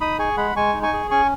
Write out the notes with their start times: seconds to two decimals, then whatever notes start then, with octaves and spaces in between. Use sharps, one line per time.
0.01 D#4 B5 D#6
0.19 G#4 G#5 C#6
0.37 G#3 F#5 B5
0.56 G#3 G#5 C#6
0.74 D#4
0.83 G#5 C#6
0.93 G#4
1.11 C#4 G#5 C#6